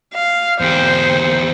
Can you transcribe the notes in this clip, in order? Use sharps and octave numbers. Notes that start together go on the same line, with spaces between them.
F5
E2 G4 C5